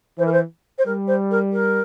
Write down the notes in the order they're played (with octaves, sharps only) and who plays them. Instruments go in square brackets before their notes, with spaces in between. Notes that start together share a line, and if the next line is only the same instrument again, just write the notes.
[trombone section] E3 [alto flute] C5
[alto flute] A#4
C5
C5
[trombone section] G3 [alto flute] A#4
[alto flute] C5
A#4
A#4